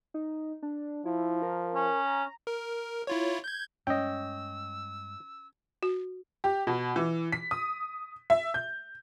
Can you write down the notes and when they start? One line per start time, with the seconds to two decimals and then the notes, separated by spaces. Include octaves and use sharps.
0.14 D#4
0.62 D4
1.06 F3 E4
1.42 A#4
1.75 C#4
2.05 A#5
2.47 A#4
3.07 E4 F4 C#5
3.44 G6 G#6
3.87 G2 G3 G#3 C#4 D#5 G5 E6
5.83 F#4
6.44 G4
6.67 B2
6.96 E3
7.32 B6
7.51 D#6
8.30 E5
8.54 G6